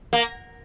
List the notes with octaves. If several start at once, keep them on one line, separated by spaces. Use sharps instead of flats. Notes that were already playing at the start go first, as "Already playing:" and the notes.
A#3